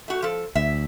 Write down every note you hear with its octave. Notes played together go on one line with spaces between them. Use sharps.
A3 F#4
F3 A4
D2 E5